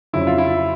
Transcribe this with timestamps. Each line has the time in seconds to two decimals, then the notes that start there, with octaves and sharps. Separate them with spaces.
0.13 F2 C#3 F#3 E4
0.27 F4
0.38 E4